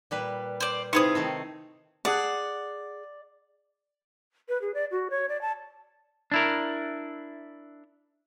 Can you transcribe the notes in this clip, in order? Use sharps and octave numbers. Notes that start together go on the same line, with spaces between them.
A#2 G3 B4
C5 D5
C3 D#4 E4 G#4 B4 C5 F5 D#6
D#3 A3 C4
G#4 D5 F#5 A5
B4
G#4
D5
F#4
C#5
D5
A5
D4 E4 A#4